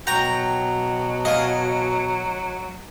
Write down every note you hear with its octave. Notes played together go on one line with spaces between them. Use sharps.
B2 F#3 C#5 G5 A#5
G#4 D#5 F5 G#5